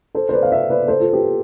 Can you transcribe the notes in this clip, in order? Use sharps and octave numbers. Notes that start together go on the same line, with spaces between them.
A4 C5
C5
B4 D5
F5
C5 E5
B4 D5
A4 C5
F4 A4
G4 B4